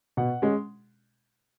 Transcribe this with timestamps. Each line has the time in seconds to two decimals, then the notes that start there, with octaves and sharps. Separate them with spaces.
0.17 B2 F#5
0.42 G#3 C#4